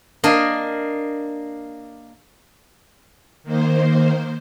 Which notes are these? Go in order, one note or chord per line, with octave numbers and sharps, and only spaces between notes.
A#3 D4 D#5
D#3 A#3 C5